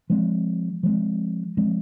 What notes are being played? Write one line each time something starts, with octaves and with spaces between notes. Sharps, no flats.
F3 G#3 C4
F3 G#3 C4
F3 G#3 C4